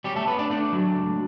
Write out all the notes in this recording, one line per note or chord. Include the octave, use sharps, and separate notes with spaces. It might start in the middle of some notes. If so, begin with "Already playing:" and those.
G3 C#4 G4
A3 A4
B3 C#4 B4
D4 D5
A3 D4 D5
F#3
C#2